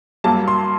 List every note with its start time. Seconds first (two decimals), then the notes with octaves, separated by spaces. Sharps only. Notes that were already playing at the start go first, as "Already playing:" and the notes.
0.24 G2 F#3 A#3 A5
0.48 C6